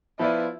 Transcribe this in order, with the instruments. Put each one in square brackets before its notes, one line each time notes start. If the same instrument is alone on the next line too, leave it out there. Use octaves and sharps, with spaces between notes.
[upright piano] F3 B3 F4 B4 D5 [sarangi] E4